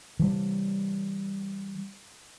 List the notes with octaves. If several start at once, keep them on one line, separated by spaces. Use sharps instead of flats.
E3 G3